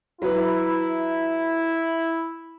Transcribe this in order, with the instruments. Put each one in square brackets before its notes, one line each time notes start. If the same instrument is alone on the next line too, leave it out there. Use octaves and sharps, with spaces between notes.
[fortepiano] F#3 B4 [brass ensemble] E4